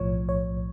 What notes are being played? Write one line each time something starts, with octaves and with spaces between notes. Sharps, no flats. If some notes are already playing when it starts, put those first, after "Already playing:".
Already playing: B1 A2 F3 C#5
C#5